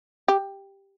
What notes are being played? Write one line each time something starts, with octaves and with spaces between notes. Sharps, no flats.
G4